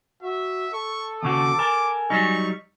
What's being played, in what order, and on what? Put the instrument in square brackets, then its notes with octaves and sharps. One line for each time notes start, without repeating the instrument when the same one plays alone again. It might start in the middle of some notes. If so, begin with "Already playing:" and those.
[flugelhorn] F#4 [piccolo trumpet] E5
[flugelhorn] A4 [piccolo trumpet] C#6
[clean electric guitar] D#2 C#3 F#4 [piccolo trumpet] D6
[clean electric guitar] A4 A#4 [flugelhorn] G#5
[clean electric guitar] F#3 G3 D#4 [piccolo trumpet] C#6